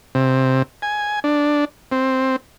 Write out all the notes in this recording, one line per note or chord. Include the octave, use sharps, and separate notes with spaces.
C3
G#5
D4
C4